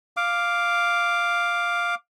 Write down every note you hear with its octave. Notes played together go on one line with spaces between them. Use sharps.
F5 D6